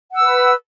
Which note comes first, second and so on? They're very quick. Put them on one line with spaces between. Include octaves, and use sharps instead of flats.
F#5 E6 B4